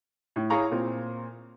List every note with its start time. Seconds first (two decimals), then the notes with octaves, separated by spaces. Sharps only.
0.36 A2
0.50 E4 G#4 C#5 F5 A#5 C#6
0.71 A#2 C4